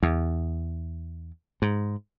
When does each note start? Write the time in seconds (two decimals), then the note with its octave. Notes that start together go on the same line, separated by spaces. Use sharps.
0.03 E2
1.62 G#2